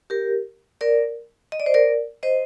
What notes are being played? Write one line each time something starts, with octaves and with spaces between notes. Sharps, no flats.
G4 A#4
A#4 D5
D#5
D5
C5
A#4 D5
C5 D#5